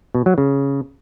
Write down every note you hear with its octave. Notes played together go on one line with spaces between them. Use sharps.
B2
F#3
C#3